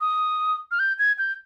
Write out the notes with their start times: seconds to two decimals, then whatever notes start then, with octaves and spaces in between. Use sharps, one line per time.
0.01 D#6
0.71 F6
0.79 G6
0.99 G#6
1.18 G6